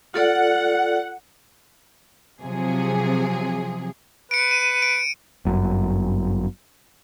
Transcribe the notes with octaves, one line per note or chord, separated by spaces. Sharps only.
F4 A4 D5 F#5
C3 F3 F#3 G#4
B4 C#7 D7
D#7
D7
G1 F#2